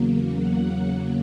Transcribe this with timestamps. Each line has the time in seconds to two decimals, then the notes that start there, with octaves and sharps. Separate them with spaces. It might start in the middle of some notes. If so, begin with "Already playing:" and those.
Already playing: E2 C#3 F#3 A#3
0.37 F#5